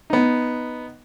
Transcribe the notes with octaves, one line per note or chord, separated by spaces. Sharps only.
B3 D#4